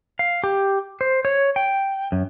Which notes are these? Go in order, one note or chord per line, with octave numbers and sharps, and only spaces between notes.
F5
G4
C5
C#5
G5
F#2